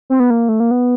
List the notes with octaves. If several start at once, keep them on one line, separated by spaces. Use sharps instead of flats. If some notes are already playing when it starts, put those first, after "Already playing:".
C4
B3
A#3
A3
A#3
B3